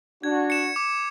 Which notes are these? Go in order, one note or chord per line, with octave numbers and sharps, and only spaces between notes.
D4 F#4 G#6
C#7 E7
D6